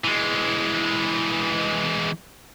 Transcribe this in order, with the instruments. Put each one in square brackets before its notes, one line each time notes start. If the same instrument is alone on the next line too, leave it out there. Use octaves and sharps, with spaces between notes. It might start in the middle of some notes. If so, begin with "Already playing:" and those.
[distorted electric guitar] E3 G#3